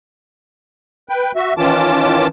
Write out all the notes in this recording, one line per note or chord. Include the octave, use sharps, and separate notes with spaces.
B4 G5
F#4 E5
D#3 E3 C#4 F4 A5 D6